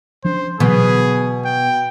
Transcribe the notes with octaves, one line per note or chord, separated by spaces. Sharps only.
F3 C#4 D4 C5
B2 D3 E3 F#3 G#4
G5